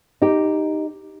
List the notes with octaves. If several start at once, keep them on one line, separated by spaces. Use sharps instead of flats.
D#4 G4